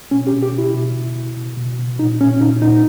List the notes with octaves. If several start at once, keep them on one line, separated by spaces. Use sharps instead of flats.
B2 C#4
G4
B2
G4
B2
E4
B2
B2
B2
B2
B2
B2
A#2 D#4
A#2 C#4
A#2 D#4
A#2 D#4